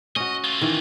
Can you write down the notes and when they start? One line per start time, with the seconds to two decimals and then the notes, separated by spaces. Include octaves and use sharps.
0.16 C#4 F#4 D#5
0.44 A3 F4
0.61 D#3 E3